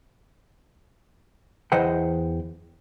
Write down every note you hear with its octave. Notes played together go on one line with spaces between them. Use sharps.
E2 E3 C5 D#5 F#5 G5